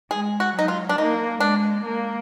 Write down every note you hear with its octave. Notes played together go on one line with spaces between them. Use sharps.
G#3 G#4
F#4
F#3 D#4
F4
D4
A#3 D#4
G#3 D4
A#3